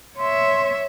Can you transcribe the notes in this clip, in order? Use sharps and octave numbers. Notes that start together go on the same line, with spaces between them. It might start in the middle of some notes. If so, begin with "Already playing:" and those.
C#5 E5 C6